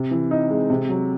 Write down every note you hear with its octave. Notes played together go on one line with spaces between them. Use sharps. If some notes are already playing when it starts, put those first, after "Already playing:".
Already playing: C3
E3
D#4
G#3
C3
F#3